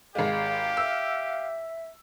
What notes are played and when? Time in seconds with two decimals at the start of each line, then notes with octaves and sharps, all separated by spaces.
0.15 G#1 G#3 G4 F5
0.77 E5 E6